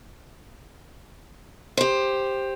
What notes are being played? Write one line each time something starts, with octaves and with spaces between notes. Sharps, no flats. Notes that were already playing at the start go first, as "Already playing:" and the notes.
G4 C5